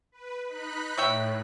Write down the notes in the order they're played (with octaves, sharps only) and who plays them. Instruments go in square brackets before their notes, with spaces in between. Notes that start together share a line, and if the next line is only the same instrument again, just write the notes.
[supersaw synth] B4
D#4 B5 F#6
[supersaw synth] A2 [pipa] C#5 E5 G5